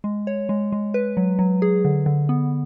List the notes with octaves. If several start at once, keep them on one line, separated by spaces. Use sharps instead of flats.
G#3
C#5
G#3
G#3
B4
F#3
F#3
G#4
D3
D3
B3